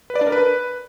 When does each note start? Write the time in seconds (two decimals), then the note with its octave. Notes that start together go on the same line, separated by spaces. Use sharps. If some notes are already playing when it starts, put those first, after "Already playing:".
0.10 B4
0.16 D5
0.21 D4
0.27 A#4
0.32 B4